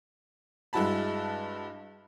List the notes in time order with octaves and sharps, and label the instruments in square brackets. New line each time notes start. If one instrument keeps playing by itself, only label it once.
[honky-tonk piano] G2 G#3 E4 F#4 A5 B5